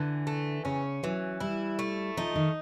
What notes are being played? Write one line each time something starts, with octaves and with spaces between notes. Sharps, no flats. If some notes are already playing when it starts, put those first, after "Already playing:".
Already playing: D3 E3
A3
C#3 C#4
E3 F#3
G3 E4
A3
F3 D#4
D#3